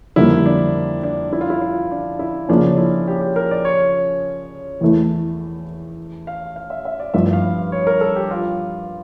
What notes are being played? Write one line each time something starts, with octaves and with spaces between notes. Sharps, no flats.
F2 D3 G3 A#3 E4
D4
D4
E4
F4
E4
F4
D4
E4
C#3 F3 A#3 C#4 D4
E4
G4
G4
A#4
D5
C#5
E2 E3 A3
F5
F5
E5
E5
D5
G2 F3 A3 E4 E5
F5
C#5
A#4
A4
G4
F4